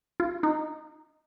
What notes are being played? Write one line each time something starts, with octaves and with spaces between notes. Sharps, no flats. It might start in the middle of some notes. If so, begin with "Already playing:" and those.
F4
D#4